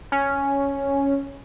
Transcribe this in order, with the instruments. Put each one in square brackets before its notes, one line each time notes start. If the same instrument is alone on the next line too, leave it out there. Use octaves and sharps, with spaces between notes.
[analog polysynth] C#4